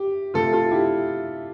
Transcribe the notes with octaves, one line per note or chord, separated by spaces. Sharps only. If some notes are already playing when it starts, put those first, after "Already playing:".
Already playing: G4
C3 F3 A3 F4 A4
F4 A4
E4 G4